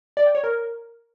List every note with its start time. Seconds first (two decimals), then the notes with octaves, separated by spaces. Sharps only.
0.17 D5
0.26 G5
0.35 C#5
0.44 A#4